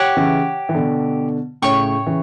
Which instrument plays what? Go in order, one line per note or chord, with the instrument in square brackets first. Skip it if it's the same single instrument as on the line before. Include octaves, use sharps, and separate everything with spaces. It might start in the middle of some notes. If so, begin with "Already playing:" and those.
Already playing: [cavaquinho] G4 C#5 F#5 C#6
[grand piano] C#3 E3
E3
B2 D3
[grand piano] A2 C#3 [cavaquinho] C#5 G5 C#6
[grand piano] C#3 E3